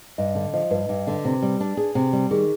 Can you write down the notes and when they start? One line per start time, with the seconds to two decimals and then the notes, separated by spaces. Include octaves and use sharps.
0.18 G2 D#5
0.35 D3
0.53 F3 D#5
0.71 G2 B4
0.89 G2
1.07 D3
1.25 C3
1.42 G3
1.60 D4
1.77 G#4
1.95 C3
2.13 G3
2.31 D#3 G#4